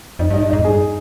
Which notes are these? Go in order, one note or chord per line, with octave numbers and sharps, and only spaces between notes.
F2 D#4
G2
D#4
G2
G#2 D#4
F2
G2 G#4